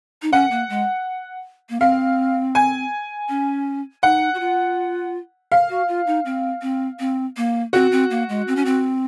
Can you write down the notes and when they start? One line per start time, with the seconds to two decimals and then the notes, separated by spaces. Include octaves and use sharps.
0.22 D#4
0.33 C#4 F#5
0.51 A#3
0.69 G#3
1.70 A#3
1.80 C4 F5
2.55 G#5
3.29 C#4
4.03 D#4 F#5
4.34 F#4
4.40 F4
5.52 F5
5.69 F#4
5.88 F4
6.07 D#4
6.26 C4
6.62 C4
6.99 C4
7.37 A#3
7.73 C4 F#4
7.92 C4
8.11 A#3
8.29 G#3
8.48 C4
8.56 C#4
8.65 C4